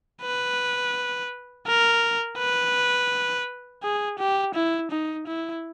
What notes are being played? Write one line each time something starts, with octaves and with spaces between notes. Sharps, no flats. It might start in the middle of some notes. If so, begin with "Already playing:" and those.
B4
A#4
B4
G#4
G4
E4
D#4
E4